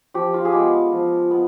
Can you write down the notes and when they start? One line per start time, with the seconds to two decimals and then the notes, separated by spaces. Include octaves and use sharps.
0.14 F3 G4
0.34 F4
0.45 G#4
0.53 G#3 B3 G4
0.92 F3
1.31 B3